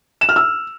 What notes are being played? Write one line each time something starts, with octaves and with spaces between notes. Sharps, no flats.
E7
F6
E6